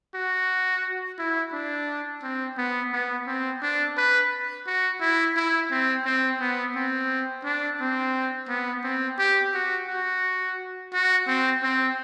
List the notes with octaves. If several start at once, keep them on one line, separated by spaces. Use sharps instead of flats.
F#4
E4
D4
C4
B3
B3
C4
D4
B4
F#4
E4
E4
C4
C4
B3
C4
D4
C4
B3
C4
G4
F#4
F#4
F#4
C4
C4